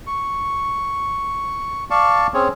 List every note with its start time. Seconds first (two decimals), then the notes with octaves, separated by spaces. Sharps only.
0.07 C#6
1.91 D5 F5 A5 C#6
2.34 C4 C#4 G#4 C#5